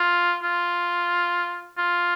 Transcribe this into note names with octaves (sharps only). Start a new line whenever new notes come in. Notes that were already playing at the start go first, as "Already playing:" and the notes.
Already playing: F4
F4
F4